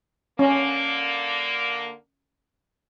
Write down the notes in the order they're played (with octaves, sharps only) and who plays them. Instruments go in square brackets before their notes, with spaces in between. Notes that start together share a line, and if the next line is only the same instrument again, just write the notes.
[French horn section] D3 A#3 [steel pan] C#4